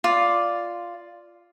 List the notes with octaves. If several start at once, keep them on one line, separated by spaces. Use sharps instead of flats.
F4 D5